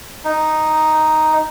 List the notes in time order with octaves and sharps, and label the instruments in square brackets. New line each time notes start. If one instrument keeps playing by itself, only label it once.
[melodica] D#4